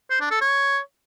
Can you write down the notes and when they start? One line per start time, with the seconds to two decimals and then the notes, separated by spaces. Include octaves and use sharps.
0.10 C5
0.21 D4
0.31 A4
0.41 C#5